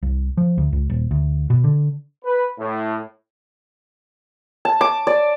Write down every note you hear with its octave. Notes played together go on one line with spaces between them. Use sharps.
C2
F3
D2
C#2
D#1
D2
B2
D3
B4
A2
A5
D6
D5